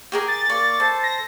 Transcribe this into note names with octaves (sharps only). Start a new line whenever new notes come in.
G4 G#4 A#4
A6
A#3 D5 C#6
A4 C5 A5
A#6